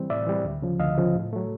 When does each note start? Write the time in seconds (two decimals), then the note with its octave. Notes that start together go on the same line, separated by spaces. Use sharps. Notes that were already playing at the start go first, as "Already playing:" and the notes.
Already playing: E3 G3 C4
0.10 A2 D5 E5
0.27 E3 G3 C4
0.44 D2
0.62 C#3 F3
0.80 D2 D#5 F5
0.98 C#3 F3
1.15 A2
1.33 F#3 A3